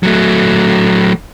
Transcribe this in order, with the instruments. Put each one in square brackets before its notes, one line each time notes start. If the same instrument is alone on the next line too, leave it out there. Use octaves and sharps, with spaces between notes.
[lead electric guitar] F#3 A3